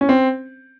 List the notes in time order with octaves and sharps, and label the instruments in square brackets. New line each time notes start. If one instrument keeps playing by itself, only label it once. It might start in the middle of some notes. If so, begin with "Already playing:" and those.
[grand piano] C#4
C4